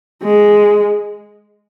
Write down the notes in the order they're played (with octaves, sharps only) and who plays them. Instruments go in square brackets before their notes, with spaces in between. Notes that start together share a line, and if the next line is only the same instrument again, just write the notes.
[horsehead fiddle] G#3